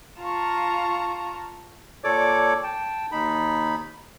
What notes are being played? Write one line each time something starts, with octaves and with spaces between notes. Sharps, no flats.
F4 F5 A5 A#5 C#6
A#2 A4 C#5 D5 D6
G5 A5
D#2 D#4 B5